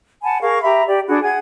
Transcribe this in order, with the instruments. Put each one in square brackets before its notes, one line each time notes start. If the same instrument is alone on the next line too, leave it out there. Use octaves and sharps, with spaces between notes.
[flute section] F#5 G#5 A5 B5
G#4 A#4 F5 C#6
G4 E5 A#5 B5
G4 D5
D4 F#4 G#4 B5
G#4 F#5 G#5 G#6